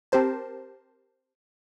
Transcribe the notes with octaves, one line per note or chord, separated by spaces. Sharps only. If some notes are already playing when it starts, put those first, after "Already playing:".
C4 G4 A#4 C5 A5